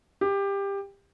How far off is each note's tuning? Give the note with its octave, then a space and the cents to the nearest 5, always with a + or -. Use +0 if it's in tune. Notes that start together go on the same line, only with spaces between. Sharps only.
G4 +20